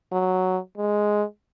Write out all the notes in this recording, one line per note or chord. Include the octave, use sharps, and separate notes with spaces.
F#3
G#3